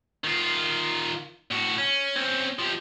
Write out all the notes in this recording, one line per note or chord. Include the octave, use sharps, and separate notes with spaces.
D#3 F4
A2 F#4
C#4
C4 C#4
F3 G4